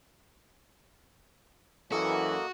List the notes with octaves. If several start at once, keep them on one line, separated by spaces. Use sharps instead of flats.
F#2 E3 A#3 F#4 A4 D#5